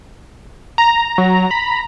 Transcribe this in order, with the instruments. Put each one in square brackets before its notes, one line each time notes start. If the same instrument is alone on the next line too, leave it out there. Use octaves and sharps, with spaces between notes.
[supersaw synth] A#5
[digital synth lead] F#3
B5